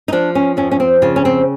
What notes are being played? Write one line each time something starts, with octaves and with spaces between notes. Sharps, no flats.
D#4
F3 D4
C#4
F2 C#4
C#4
C4
C#3 F4
C#4
C4